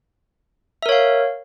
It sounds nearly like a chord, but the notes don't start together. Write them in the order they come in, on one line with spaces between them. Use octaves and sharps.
E5 A#4 C#5 F5